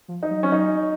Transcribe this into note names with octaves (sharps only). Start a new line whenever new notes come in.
F3
D#4
F#3
C#4
D#4